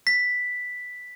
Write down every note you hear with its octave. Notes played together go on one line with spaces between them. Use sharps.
B6